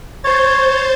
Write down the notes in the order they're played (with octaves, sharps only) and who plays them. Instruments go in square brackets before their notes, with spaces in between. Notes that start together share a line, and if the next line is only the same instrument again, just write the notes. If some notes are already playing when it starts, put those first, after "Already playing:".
[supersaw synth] C5 G6 A6 [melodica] C#5